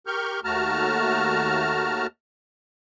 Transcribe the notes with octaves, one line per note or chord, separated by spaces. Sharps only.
G4 A#4 C#6 F6 G6
D#2 A3 F#4 A5 A#5 F6